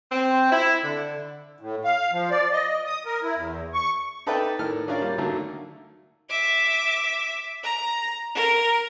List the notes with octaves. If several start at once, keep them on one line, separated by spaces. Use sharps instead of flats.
C4
E4
D3
A2
F5
F3
D5
D#5
D#6
A#4
E4
E2
C#6
D#4 A4 B4 D5 E5 G5
A2 D#3 A4 F6
C#4 D4 E4 F4 A#4 D5
G3 A#3 F4
D3 D#3 F#3 A3 A#3 E4
E5 D6
A#5
A#4